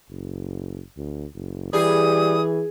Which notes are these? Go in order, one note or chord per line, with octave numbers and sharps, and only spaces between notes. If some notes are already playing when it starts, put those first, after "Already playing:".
F#1
D2
F#1
E3 G3 G#4 D#6